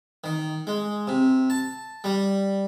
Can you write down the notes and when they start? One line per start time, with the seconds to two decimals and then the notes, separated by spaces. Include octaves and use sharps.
0.24 D#3
0.67 G#3
1.07 C3
1.50 A5
2.04 G3